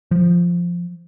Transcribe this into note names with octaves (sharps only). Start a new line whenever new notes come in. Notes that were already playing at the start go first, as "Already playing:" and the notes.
F3